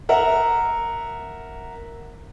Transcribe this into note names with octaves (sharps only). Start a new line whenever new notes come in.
A#4 E5 F#5